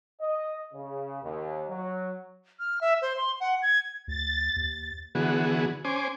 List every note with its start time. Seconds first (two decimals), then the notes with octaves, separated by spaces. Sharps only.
0.20 D#5
0.74 C#3
1.22 D#2
1.69 F#3
2.60 F6
2.81 E5
3.02 C5
3.17 C6
3.40 F#5
3.62 G#6
4.08 D2 A6
4.56 D#2
5.15 D3 E3 B3 F#4 G#4
5.85 C#4 C5 G#5 D6